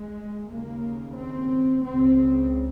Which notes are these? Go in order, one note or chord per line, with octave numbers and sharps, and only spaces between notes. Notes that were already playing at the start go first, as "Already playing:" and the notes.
Already playing: G#3
D#2 C#3 A#3
C4
C#2 C#3 C4